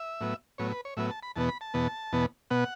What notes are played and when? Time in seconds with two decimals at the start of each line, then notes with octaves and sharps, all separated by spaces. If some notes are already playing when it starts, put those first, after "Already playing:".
Already playing: E5
0.21 A2 F#3 B3
0.58 A2 F#3 B3 C#5
0.72 B4
0.85 C#5
0.97 A2 F#3 B3 E5
1.11 A5
1.23 B5
1.36 E2 B2 B3 A5
1.49 B5
1.61 A5
1.74 E2 B2 B3
2.13 E2 B2 B3
2.51 B2 B3 F#5